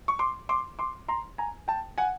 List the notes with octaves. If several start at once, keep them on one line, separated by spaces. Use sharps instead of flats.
C#6
C6 D6
C6 D6
C6 D6
A#5 C6
G#5 A#5
G5 A5
F#5 G#5